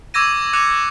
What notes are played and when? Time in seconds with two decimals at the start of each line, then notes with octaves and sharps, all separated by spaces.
0.14 C#6 D6 E6 G#6 A#6 D#7
0.53 D6 F#6 C#7 F7